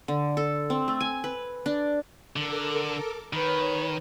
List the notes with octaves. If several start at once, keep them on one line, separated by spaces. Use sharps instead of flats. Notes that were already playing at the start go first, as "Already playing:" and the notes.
D3
A4
C4
A3
G#5
B4
D4
D3 A4 A#4 D6
D#3 B4 C#5